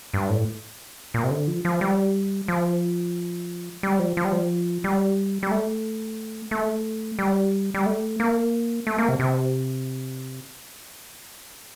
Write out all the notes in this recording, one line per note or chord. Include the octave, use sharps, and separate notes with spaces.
G2
A2
A#2
C3
D3
F3
F3
G3
F3
G3
F3
F3
G3
F3
G3
G3
A3
A3
G3
G3
A3
A#3
A3
A#3
C3
C3